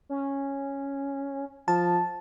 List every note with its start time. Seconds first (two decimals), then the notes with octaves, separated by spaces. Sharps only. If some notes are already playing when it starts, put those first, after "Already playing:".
0.09 C#4
1.68 F3 A5